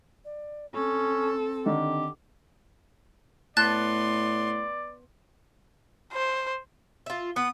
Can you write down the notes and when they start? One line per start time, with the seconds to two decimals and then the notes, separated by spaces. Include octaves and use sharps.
0.25 D5
0.75 C4 C#4 A4
1.66 D3 D#3 D4 G4
3.57 A2 B3 D5 A5 C6 F#6 A6
6.13 C5
7.06 F4 E5
7.36 B3 D#6